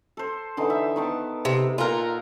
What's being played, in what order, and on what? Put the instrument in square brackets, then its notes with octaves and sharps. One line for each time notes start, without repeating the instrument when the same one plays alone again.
[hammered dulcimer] A4 C5
D3 E3 D#4
E5
D#3 B3 A5
[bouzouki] C3
[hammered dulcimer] A#2 A4 F#5 [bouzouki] F4 A#4